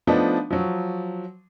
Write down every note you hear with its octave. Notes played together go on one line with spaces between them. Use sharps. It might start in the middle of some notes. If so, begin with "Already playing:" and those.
F3 A3 B3 D4 D#4
F3 F#3